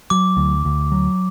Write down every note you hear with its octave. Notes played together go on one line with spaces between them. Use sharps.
F#3 D6
D2
D2
F#3